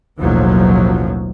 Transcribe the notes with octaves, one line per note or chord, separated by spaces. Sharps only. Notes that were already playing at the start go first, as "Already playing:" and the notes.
A1 D#2 B2 F3 F#3